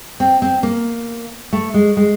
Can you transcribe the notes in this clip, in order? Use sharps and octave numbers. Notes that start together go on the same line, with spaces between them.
C4
C4
A#3
A3
G#3
G#3